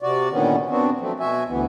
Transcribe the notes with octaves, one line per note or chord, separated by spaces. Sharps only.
C3 F#4 D5
A#2 D3 D#3 B3 C#4
B3 C4 D4 F#4
F3 F#3 A3 C4
B2 F#4 E5 G#5
D2 E3 B3